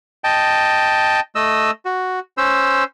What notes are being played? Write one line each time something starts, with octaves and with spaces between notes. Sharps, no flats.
D#5 G5 A5
A3 D#5 E6
F#4
C#4 C5 E6